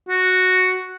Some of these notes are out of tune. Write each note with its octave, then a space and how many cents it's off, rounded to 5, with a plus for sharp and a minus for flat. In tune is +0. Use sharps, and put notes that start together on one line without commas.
F#4 +0